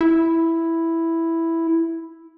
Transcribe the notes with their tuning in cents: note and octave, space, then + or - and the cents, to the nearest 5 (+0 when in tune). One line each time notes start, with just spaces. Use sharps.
E4 +0